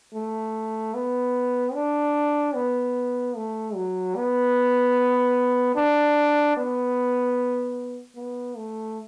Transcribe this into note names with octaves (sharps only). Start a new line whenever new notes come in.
A3
B3
D4
B3
A3
F#3
B3
D4
B3
B3
A3